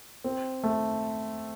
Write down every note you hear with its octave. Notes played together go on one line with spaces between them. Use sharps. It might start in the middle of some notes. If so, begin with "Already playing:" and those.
C4
A3